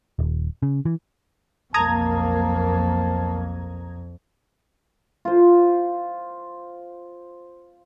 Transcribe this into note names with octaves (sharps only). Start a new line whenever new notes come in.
D#1
C#3
E3
B1 F2 A#3 A5 A#5 D#6 G#6
F4 C5